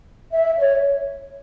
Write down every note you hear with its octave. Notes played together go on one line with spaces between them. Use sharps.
E5
C#5